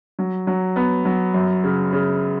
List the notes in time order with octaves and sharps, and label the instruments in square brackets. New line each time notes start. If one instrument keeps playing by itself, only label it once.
[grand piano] F#3
F#3
B3
F#3
F#2
C#3
C#3